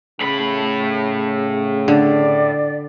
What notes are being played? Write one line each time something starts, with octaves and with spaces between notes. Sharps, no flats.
A2 C#3 B5
D3 D5